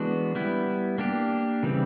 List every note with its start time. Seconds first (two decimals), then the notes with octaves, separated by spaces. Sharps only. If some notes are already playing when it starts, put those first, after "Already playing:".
Already playing: E3 G#3 B3 D4 F#4
0.35 G3 B3 E4
0.98 A#3 D4 G4
1.63 C#3 E3 G3 C4